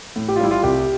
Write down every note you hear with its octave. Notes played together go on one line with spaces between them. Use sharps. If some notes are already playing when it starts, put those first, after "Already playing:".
A2
G4
F4
G3 E4
F4
C2 G4